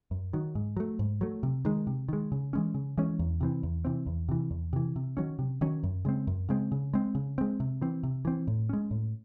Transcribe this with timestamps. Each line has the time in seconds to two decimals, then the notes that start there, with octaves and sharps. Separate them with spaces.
0.11 F#2
0.33 D#3 F#3
0.55 G#2
0.77 F#3 A3
0.99 G#2
1.21 F#3 A3
1.43 C3
1.65 D#3 G#3
1.87 C3
2.09 D#3 G#3
2.32 C#3
2.53 E3 G#3 C#4
2.75 C#3
2.97 E3 G#3 C#4
3.19 E2
3.41 C3 E3 C4
3.63 E2
3.85 C3 E3 C4
4.07 E2
4.29 C3 E3
4.51 E2
4.73 C3 E3
4.96 C3
5.17 D#3 F#3 C#4
5.39 C3
5.61 D#3 F#3 C#4
5.83 F#2
6.05 C#3 G#3 C4
6.27 F#2
6.49 C#3 G#3 C4
6.72 C#3
6.94 G#3 C4
7.15 C#3
7.38 G#3 C4
7.60 C3
7.81 E3 C4
8.03 C3
8.25 E3 C4
8.48 A2
8.69 G#3 C#4
8.91 A2